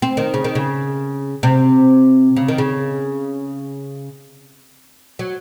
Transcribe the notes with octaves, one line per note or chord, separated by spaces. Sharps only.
C4
D#3
C#3
D#3
C#3
C3
C#3
D#3
C#3
F#3